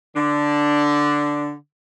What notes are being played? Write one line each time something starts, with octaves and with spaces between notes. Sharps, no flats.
D3 D4